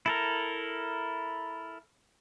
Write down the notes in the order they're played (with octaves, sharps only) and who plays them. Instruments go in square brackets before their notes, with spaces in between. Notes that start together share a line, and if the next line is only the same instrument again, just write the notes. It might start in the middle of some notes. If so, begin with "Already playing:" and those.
[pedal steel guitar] E4 A4 A#4